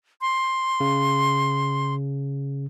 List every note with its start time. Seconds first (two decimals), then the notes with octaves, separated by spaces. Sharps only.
0.21 C6
0.80 C#3